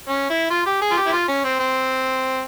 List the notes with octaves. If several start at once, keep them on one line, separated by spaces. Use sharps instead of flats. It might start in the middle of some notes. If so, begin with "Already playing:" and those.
C#4
E4
F4
G4
G#4
F4
G4
E4
F4
C#4
C4
C4